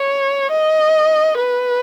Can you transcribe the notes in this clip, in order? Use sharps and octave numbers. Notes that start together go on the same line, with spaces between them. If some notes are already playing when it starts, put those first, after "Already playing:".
Already playing: C#5
D#5
B4